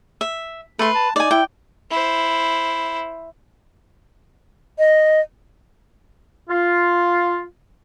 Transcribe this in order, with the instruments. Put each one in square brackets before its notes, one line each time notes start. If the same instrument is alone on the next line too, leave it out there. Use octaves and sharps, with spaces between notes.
[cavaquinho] E5
[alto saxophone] A3 [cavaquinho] B4 C6
[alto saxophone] A5
[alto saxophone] D#4 [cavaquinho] D5 G#5
[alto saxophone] E4 [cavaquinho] G5
[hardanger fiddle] E4 C5
[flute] D#5
[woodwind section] F4